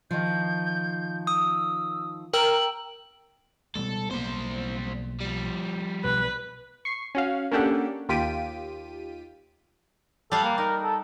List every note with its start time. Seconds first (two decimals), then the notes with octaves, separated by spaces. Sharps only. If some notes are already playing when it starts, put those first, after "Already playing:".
0.11 D#3 F3 G6
1.27 D#6 E6
2.34 A#4 G5 E6 F#7
3.76 B2 G3 G#3 A4
4.11 B1 G3 A#3 B3 C5
5.21 F3 G3
6.04 B1 B2 B4
6.85 C#6 C7
7.15 C#4 F#4 F5
7.51 A#3 C#4 D4 G4 A4 F#5
8.09 D#2 F4 G4 B6 D7 D#7
10.32 G3 A4 F5 F#5
10.44 A#3
10.58 D#4 A#4
10.83 A4